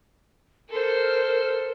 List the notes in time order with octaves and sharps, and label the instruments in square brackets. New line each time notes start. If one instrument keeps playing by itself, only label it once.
[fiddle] A4 C5 [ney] A#4